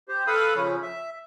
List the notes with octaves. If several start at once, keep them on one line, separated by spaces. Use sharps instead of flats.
G4 C5
A4 B4 F5 B5 D#6
C#3 F3 C#4
E5